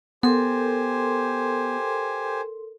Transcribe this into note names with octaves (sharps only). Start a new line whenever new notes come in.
B3 G4 A4 A#4 C5 G#5 C6